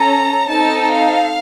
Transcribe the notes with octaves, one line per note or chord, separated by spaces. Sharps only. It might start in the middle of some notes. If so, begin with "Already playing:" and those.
Already playing: C#4 A4 A#5
C4 D#4 A4 A5
F5